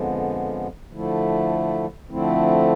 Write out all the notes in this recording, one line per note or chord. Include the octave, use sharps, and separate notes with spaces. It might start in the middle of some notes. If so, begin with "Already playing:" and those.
Already playing: F2 D3 F3 G#3 B3
D3 F3 A3 E4
D3 F3 A3 C4 E4